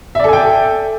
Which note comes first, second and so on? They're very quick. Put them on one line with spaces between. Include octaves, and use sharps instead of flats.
E5 D5 A4 G#5 G5